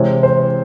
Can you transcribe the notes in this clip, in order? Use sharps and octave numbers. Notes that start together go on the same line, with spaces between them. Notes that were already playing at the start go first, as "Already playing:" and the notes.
Already playing: C3 E3 G#3 C4 C#5
C5